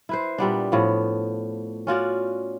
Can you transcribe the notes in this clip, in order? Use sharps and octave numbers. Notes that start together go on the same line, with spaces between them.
E4 B4 C5
A#2 G3 B3 D4
A2 F3 B3
C#4 F4 F#4 D5